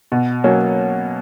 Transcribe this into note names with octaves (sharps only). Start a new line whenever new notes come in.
B2
F#3 A#3 C#4